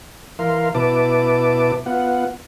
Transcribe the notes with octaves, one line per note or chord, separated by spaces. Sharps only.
E3 A#4 F5 C6
B2 E4 B4 A5 D6
B3 F4 F#5